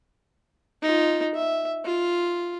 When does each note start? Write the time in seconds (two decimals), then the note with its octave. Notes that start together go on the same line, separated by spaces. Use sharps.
0.82 D#4 F4
1.35 E5
1.85 F4